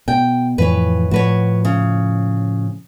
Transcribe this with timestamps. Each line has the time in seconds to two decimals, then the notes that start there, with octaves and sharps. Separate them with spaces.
0.08 B2 G5
0.58 F2 A2 E3 B4 C#5
1.11 A2 F3 F#4 B4 C#5
1.65 C#3